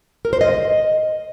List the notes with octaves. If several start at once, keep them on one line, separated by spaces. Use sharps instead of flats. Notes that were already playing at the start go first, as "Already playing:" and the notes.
A#4
C5
D#5